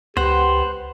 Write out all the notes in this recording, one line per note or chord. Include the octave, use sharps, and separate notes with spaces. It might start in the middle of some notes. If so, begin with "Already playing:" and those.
C#2 B3 G4 C5 F#5